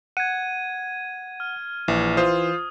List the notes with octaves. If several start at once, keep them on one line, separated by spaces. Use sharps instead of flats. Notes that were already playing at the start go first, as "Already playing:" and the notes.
F#5 G#6 D#7
F6
A#1 E3
F4 C5 D#6